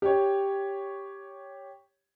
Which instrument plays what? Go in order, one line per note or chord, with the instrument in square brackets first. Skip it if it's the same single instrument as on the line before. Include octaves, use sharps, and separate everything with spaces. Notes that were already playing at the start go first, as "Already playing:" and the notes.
[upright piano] G4 C#5